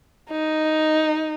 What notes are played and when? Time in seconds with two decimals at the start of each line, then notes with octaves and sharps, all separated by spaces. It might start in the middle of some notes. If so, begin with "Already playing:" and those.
0.31 D#4